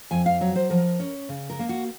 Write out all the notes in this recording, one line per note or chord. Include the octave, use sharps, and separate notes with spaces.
F2 G#5
F5
F#3 C#5
C5
F3 A#4
C#4
C#3
A#4
A#3
F#4